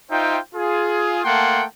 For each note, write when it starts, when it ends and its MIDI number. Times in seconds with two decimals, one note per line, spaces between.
0.11 0.38 63
0.11 0.38 65
0.11 0.38 72
0.11 0.38 76
0.11 0.38 79
0.55 1.21 65
0.55 1.21 68
1.24 1.64 57
1.24 1.64 58
1.24 1.64 78
1.24 1.64 79
1.24 1.64 81
1.24 1.64 84